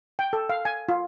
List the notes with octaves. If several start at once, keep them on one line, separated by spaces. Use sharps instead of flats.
G5
A4
F5
G#5
F4